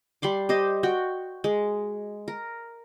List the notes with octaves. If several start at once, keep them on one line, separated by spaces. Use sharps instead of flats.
G3 B5 C6 D6
G4 C5 D#5
F#4 G5
G#3
A#4